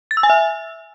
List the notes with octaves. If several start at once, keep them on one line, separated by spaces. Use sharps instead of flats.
A6
E6
G#5
E5